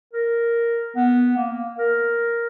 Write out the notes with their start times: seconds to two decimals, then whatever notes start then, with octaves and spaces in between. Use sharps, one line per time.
0.13 A#4
0.96 B3
1.37 A#3
1.51 A#3
1.79 A#4